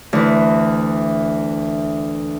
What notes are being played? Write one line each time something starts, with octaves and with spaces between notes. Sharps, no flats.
D2 E3